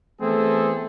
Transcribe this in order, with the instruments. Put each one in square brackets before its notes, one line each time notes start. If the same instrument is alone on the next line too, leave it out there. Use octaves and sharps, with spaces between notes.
[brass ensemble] E3 A3 B3 C4 G#4 A4